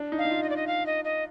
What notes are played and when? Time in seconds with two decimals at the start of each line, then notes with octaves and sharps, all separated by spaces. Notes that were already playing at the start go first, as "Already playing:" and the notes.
Already playing: D4
0.12 D#4
0.18 F5
0.25 D#4
0.31 F4
0.43 D#5
0.50 D5
0.56 D#5
0.67 F5
0.86 D#5
1.05 D#5